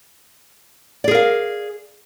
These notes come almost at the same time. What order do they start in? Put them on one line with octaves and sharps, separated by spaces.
D5 G#4 A#4 F5